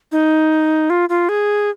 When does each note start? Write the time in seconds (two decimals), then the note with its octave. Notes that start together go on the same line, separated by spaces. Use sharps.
0.12 D#4
0.90 F4
1.09 F4
1.29 G#4